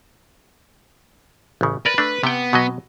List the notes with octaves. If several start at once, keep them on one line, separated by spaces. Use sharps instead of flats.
A1 C#3
A#4 B4 D5
A3 D4
C3 B3 G5
B2 F#3 D#5